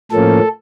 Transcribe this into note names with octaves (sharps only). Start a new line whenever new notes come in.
A2 F3 A#3 C#4 A4